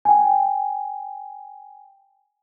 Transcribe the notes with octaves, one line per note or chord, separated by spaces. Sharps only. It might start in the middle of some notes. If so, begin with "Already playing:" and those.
G5 G#5